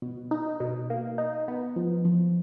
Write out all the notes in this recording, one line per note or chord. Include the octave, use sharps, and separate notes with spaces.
B2
D#4
B2
A#3
D#4
B3
F3
F3